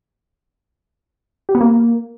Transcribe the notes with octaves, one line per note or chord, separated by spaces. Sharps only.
G4
B3
A#3